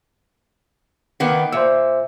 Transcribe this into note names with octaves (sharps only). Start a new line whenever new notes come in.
D#3 A#3 B3
A#2 C5 E5 E6